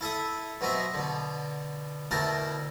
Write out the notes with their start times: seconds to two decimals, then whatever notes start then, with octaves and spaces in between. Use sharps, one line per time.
0.01 E4 A4 E5 D#6
0.61 B2 F#3 C4 D#5 E5
0.94 B2 D3
2.11 D2 B2 E4 A#4 G5 A5